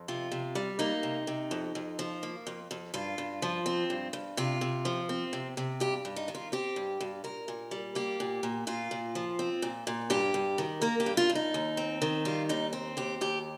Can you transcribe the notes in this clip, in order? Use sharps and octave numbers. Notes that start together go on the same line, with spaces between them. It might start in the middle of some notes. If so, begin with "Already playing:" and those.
Already playing: F2
C3 F4
C3
G3
A#3 D#4
C3
C3
F2
F2
F3
A#3
F2
F2
G2 F4
G2
F3
C4
G2
G2
C3 F4
C3
F3
C4
C3
C3
G2 G4
G2
D#4
D#3
F4
C4 G4
G2
G2
A#2 A#4
A#2
G3
A#3 G4
A#2
A#2
A#2 F4
A#2
F3
C4
A#2
A#2
G2 G4
G2
D#3
A#3 A#4
G4
G2
F4
G2
D#4
D#2
C4
D#3
G3 F4
D#2 D#4
C4
D#2 G4
D#2 G4